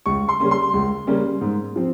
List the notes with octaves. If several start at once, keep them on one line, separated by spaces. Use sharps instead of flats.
C#2 C#6
C6
C#3 G3 A#3 C#4
C6
C#2
C#3 G3 A#3 C#4
G#2
F3 C4